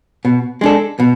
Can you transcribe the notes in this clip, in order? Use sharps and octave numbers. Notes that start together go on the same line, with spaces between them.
B2
G#3 D4 A4
B2